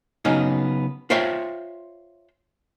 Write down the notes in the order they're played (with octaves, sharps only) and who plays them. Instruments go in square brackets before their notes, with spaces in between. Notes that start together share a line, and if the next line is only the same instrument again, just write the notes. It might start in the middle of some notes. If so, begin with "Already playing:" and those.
[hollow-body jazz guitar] C#3 F#3 B3 C#4 D#4
F4 C5 C#5 E5 G5